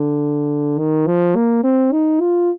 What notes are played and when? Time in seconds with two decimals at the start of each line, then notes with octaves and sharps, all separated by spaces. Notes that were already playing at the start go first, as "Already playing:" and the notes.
Already playing: D3
0.79 D#3
1.07 F3
1.35 A#3
1.64 C4
1.92 D#4
2.21 F4